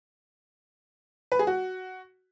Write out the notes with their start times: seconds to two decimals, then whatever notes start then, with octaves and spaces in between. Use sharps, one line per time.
1.32 B4
1.39 G#4
1.47 F#4